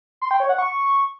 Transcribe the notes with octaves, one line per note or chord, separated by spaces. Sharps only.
C6
G5
C#5
F#5
C#6